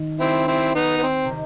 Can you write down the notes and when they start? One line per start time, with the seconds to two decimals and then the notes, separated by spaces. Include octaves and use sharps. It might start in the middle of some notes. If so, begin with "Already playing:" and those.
Already playing: D#3
0.19 C4 E4
0.48 C4 E4
0.75 B3 D#4
0.97 B3
1.03 C4
1.25 C3
1.30 D#3